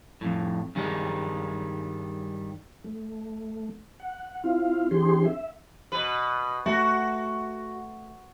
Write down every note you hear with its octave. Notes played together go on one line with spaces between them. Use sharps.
F2 A2
G2 D#3 E3 G3 G#3
A3
F#5
C4 E4 F4 F5
E3 C4 D4 G4 G#4 C6
E5
B2 B4
A3 F#4